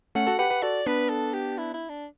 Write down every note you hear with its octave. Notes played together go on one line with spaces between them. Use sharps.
A3 C#4 F#5
F#4 A4
G4 B4 F#5
G4 B4
F#4 A4 D5
B3 D4 B4
A4
G4
E4
E4
D4